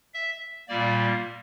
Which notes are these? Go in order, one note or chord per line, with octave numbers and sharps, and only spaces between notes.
E5
A#2 G3 A#3 D5